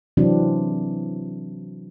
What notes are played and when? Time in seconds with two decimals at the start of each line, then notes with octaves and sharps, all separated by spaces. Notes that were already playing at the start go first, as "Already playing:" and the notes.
0.17 C3 E3 F#3 C4 D4